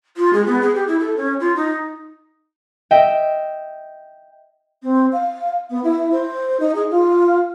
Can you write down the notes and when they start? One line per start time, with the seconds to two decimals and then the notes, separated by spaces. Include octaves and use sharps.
0.17 F4
0.33 G#3
0.46 B3
0.61 G#4
0.75 G4
0.88 E4
1.00 A4
1.17 C#4
1.40 F4
1.56 D#4
2.91 D#5 E5 G5
4.83 C4
5.12 F5
5.70 B3
5.83 E4
6.11 C5
6.60 D#4
6.74 G#4
6.90 F4